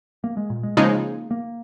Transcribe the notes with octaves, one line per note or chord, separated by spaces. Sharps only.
A#3
G#3
A#2
G#3
C#3 F3 G#3 A#3 D#4
A#3